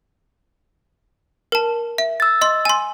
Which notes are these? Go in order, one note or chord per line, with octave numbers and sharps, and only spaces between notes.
A#4 A5
E5
E6 A6
D#5 C6
G#5 C6